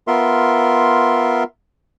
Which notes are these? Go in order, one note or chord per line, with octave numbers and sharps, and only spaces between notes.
B3 F4 A#4 E5 C6